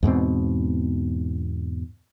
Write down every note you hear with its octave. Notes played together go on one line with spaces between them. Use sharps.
E2 G#2 B2 C4